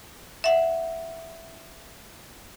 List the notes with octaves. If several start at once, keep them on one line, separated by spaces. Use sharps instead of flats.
E5 F#5